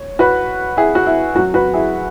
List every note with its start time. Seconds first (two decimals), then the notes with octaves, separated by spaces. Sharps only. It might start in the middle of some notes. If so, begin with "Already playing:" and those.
Already playing: C#5
0.19 F#4 B4
0.77 E4 G#4
0.95 F#4
1.06 E4
1.35 F#2 F#4
1.38 F#3
1.54 F#4 B4
1.74 E4 G#4